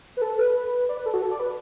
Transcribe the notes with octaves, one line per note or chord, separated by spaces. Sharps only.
B4
A4
B4
D5
B4
A4
F#4
A4
D5
B4